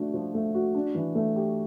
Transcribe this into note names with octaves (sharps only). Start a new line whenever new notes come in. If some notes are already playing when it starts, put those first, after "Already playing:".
Already playing: F3 A3 D4 F#4
F3
A3
F#4
D4
E3
A3
G4